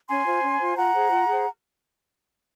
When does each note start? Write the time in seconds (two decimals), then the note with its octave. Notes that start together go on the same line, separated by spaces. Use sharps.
0.08 C#4 G#5 C6
0.26 F4 C5
0.43 C#4
0.59 F4 C5
0.76 F4 F#5 A#5
0.94 G#4 C5
1.11 F4
1.28 G#4 C5